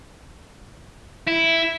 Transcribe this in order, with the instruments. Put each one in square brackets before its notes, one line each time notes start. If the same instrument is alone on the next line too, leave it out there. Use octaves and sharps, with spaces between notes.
[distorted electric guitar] E4